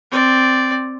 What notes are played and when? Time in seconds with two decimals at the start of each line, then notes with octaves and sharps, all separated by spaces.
0.12 C4 D5